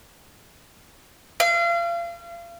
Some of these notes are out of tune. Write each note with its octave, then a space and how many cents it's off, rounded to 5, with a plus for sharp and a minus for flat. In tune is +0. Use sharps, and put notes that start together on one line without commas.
F5 -35